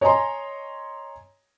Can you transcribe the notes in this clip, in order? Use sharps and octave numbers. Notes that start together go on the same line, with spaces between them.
C#5 D#5 G#5 A#5 C6